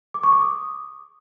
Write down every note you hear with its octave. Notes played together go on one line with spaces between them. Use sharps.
D6
C#6
D6
D#6